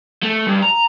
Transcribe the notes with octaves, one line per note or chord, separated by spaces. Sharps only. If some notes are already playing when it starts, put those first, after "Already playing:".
A3
G2
A#5